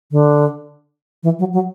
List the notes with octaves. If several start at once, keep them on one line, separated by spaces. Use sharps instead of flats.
D3
E3
F#3
F#3